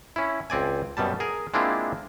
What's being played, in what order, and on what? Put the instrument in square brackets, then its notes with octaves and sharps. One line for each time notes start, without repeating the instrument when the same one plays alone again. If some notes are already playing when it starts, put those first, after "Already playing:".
[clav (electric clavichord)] C#4 E4
C#2 C4 D5 G#5
F#2 B2 G3 A5
G#4 A#4
G#3 A#3 C4 D4 E4 F4